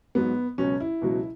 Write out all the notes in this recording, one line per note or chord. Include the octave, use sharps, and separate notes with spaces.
G#2 F#3 B3
C#2 B2 F#3 C#4
E4
C#2 B2 F#3